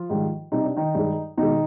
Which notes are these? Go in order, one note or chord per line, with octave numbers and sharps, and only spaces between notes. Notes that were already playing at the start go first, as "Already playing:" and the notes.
Already playing: F3 F4
G#2 D#3 G3
C3 G3 D#4
D4
D#3 D#4
G2 D#3 G#3
B2 D#3 G#3 D#4